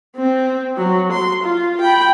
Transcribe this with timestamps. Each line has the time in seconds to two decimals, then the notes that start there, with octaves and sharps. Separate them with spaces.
0.16 C4
0.77 F#3
1.12 C6
1.44 F4
1.81 G5 B5